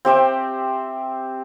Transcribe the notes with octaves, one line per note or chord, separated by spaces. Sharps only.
C4 G4 E5 G5